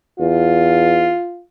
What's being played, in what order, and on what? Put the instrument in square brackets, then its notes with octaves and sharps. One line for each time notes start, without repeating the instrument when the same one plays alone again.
[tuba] E2 [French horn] F4